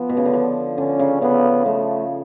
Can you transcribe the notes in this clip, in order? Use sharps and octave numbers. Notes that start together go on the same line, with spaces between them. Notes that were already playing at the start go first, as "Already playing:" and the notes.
Already playing: F3 B3
B2
C#3
D3
F3
D3 C#4
C#3
C#3 B3
F3 A3